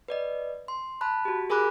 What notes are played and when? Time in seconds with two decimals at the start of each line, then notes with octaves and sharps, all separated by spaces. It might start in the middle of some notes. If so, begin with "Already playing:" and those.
0.08 B4 D5 D#5
0.68 C6
1.01 A5 B5 F#6
1.25 F#4 G4
1.50 G#4 A#4 G#5 B5 D6 F#6